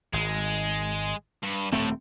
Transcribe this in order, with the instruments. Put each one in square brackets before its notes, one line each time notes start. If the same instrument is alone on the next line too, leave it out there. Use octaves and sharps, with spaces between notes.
[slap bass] G#1 [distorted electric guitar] G#3
[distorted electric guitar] G2
[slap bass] D#1 A3 C4 [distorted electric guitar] A2